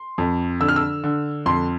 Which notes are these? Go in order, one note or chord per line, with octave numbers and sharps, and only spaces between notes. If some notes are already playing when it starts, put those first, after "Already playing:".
Already playing: C6
F2
D3 E6
F6
E6
D3
F2 C6